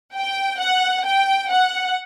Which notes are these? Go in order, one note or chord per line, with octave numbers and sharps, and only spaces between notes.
G5
F#5
G5
F#5